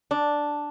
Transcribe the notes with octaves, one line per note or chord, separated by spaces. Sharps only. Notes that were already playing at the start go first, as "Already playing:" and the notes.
D4